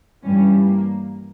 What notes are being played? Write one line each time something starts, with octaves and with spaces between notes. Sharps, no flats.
G2 E3 G3 C#4
A#3